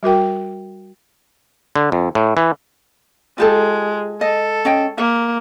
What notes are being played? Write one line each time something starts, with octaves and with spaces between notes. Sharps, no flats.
G3 F#4 A#4 G5
D3
F2
A2
E3
G#3 F4 G4 A4
A4 D#5
C#4 D#5 G5
A#3 E5